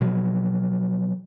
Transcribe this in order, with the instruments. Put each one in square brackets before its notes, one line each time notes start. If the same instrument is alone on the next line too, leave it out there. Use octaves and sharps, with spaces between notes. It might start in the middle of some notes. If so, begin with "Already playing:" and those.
[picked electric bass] B2 F3 F#3